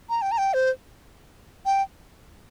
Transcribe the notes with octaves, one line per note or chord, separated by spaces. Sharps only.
A#5
G5
A#5
G5
C5
G5